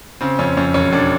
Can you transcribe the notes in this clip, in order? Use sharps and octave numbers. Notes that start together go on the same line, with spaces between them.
C#3 C4
F2 C#4
F2 C#4
E1 C#4
E1 D4